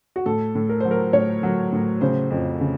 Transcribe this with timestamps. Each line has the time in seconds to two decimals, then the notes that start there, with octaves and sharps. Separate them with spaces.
0.16 F#4
0.26 A2 A4
0.55 A2
0.69 A#4
0.80 F#3 C5
0.91 A#4
1.13 A2 C#5
1.43 F#3
1.73 A2
2.01 C#3 C5
2.30 F2
2.60 C#3